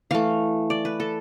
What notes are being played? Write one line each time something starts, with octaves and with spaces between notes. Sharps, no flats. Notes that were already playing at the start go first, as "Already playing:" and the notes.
E3 A3 F5
D5
B4
A4